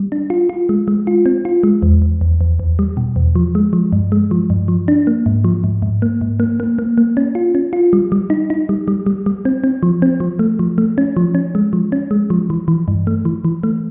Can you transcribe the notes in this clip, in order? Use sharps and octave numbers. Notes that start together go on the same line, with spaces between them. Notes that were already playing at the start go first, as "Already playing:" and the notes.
Already playing: G3
D4
F4
F4
G#3
G#3
F4
C4
F4
G#3
E2
E2
E2
E2
E2
G3
B2
E2
F3
G#3
F3
G2
G#3
F3
G2
F3
D4
A#3
G#2
F3
G#2
G#2
A#3
G#2
A#3
A#3
A#3
A#3
C#4
F4
C#4
F4
G3
G3
D#4
D#4
G3
G3
G3
G3
C4
C4
F3
C4
F3
A3
F3
A3
C#4
F3
C#4
G#3
F3
C#4
G#3
F3
E3
E3
G2
A3
E3
E3
A3